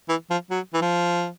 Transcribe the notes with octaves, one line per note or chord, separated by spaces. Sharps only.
E3
F3
F#3
E3
F3